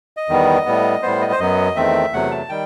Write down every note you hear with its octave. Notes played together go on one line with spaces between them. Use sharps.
D#5
E2 D#3 G3 B3
A2 G3 B3
A2 G3 B3 C5
D#5
C5
F#2 F#3 B3 D#5
E2 D#3 A3 C4 E5
E2 C3 F#3 A3 F#5
A5
D#3 G3 G5